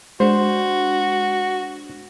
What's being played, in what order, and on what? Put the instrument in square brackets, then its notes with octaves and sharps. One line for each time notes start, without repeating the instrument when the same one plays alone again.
[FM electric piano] G#3 D4 [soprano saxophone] F#4 [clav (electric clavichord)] C5